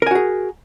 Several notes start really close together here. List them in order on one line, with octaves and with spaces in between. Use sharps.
A#4 G#5 F#4 G#4